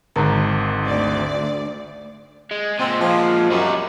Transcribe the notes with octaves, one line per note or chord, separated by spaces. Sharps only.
G#1 G#2 D3 A#5
D2 D5
G#3
A#2 G#3 C4
F3
F#2 G3 D#4 F#4